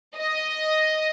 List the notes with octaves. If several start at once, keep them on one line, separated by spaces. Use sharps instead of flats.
D#5